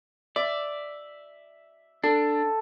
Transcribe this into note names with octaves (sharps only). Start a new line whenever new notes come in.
D5 E5
D4 A4